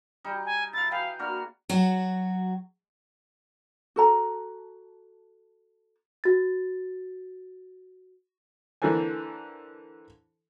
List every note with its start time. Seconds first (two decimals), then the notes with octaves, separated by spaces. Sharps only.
0.24 G3 D#4
0.45 G#5
0.73 E4 F5 A6
0.91 G#4 B4 F5 G5
1.19 A#3 D4 F#4 F6
1.69 F#3 F#4
3.96 F#4 A4 A#5
6.24 F#4 A6
8.82 D3 E3 A#3 A4 C5 G#5